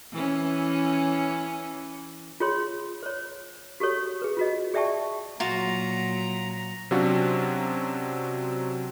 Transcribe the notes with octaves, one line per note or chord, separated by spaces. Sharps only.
E3 C#4
F4 G#4 C#5 C6
C5 C#5
F#4 G4 A4 C#5
G#4 B4
F4 F#4 D#5
G#4 D5 E5 G5 A5 C#6
A#2 F#3 F4 F#4 A#5
C3 F#3 C#4 D4 F4 F#4